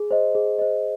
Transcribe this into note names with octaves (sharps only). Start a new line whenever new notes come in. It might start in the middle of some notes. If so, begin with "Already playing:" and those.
Already playing: G#4
C5 D#5
G#4
C5 D#5